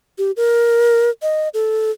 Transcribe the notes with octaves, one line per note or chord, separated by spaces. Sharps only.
G4
A#4
D#5
A4